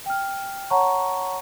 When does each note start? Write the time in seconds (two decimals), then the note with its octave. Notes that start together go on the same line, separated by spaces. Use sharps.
0.06 G5 F6
0.70 C#5 F#5 A5 A#5 C#6